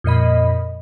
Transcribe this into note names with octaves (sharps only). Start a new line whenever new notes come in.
F2 A#2 D#5 B5